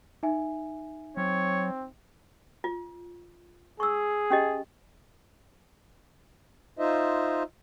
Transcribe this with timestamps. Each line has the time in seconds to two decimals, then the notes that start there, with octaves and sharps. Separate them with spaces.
0.23 D#4 E5 G#5
1.17 F#3 C4 C#5
2.64 F4
3.80 G#4 C#6 E6
4.30 C#4 G4 D#5
6.79 D#4 F4 C5 D#5 E5